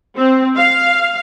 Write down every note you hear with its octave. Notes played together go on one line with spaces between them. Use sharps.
C4
F5